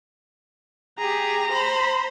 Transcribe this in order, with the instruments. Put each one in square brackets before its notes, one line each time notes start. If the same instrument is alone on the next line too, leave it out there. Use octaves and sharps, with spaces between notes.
[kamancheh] G4 G#4 [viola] A#5
[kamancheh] C5 B5